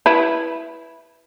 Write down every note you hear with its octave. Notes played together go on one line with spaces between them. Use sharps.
E4 B4